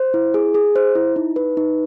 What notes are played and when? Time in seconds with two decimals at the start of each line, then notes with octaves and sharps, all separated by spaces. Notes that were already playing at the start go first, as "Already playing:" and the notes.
Already playing: C5
0.14 E4
0.34 G#4
0.54 G#4
0.76 C5
0.95 E4
1.16 D#4
1.36 B4
1.57 D#4